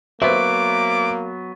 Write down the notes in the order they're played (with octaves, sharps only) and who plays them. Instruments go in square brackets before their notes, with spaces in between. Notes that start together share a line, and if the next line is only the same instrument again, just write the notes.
[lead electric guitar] F#3 B3 [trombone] A#3 [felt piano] B4 C5 E5 [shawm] D6